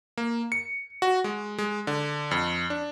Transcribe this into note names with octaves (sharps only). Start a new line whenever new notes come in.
A#3
C#7
F#4
G#3
G#3
D3
F2
D4